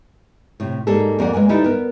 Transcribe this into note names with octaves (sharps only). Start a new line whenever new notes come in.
A2 C3
G#2 G3 A#3 G#4 A4
F2 A#3 D5 F#5
G#3 A#3 B4 G#5
D3 G3 D#4 E4 B4
B3 A#4